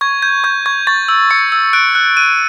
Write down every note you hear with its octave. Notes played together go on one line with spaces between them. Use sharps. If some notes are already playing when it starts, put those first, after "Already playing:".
C#6 G#6
G6 G#6
C#6 G6
C#6 G#6
C#6 A6
E6
C#6 C#7
E6
F#6 D7
F#6
F#6 D#7